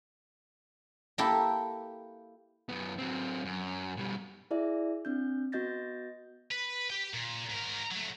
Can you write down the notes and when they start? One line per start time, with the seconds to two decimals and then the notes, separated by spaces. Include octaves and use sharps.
1.18 A#3 E4 G4 A4
2.69 F#2 B3
2.98 F#3 C4
3.45 F#2
3.97 B2 G3
4.51 E4 G#4 D5 E5
5.05 C4 D4 G6
5.52 B3 F#4 D#5 G6 A6 A#6
6.51 B4
6.90 G4 G5
7.14 A#2
7.50 G#2 A#4
7.91 F#3 A3